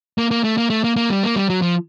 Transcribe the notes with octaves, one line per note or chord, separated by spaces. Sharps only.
A#3
A#3
A3
A#3
A3
A#3
A#3
G3
A#3
G3
F#3
F3